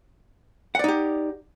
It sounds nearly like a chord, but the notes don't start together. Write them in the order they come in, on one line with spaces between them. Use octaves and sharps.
F#5 D5 D#4 G4